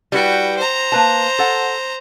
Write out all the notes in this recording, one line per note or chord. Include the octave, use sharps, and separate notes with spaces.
G3 E4 F#4 B4 G5
C5 A#5
A#3 B4 A5
A4 F#5